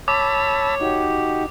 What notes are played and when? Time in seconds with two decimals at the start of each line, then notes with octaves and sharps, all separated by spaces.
0.08 C#5 A5 B5 D6 E6
0.81 D#4 F#4 G4